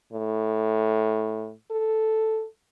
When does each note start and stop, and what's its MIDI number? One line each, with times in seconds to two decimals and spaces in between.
0.13 1.52 45
1.71 2.45 69